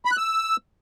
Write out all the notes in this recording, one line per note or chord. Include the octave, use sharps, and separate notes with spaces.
B5
F#6
E6